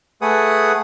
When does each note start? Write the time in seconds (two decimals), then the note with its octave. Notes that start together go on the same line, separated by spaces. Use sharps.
0.22 A3 G#4 B4 F#5 D#6